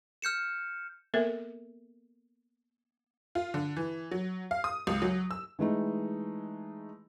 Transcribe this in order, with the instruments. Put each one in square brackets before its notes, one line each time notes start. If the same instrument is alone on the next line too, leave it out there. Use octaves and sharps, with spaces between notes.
[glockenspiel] F6 G6 C#7 E7
[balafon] A#3 B3 A4 A#4 E5
[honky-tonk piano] F4
D3
E3
F#3
F5
D#6
C#2
F#3
E6
[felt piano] E3 G#3 A3 D#4